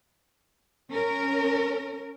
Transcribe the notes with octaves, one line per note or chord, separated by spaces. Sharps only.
C#4 A#4